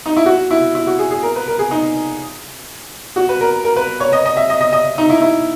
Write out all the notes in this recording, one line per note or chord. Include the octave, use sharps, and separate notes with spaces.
D#4
E4
F#4
E4
E4
F#4
G#4
G#4
A#4
B4
A#4
G#4
D#4
F#4
B4
A#4
A#4
B4
C#5
D#5
D#5
E5
D#5
D#5
D#5
D#4
E4
D#4
E4